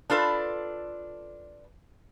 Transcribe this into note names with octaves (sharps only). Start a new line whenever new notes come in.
D4 F4 A4 B4